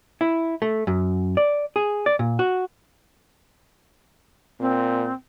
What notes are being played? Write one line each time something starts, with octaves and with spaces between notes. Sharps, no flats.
E4
A3
F#2
D5
G#4
D5
A#2
F#4
A#2 C4